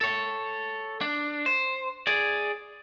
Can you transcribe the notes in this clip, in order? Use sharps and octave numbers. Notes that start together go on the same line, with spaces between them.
A4 C#5
D4
C5
G#4 D5